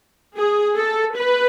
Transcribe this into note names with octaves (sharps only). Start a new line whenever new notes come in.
G#4
A4
B4